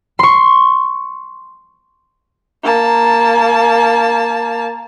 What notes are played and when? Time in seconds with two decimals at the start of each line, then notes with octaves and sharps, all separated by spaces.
0.19 C6 C#6
2.63 A#3 A5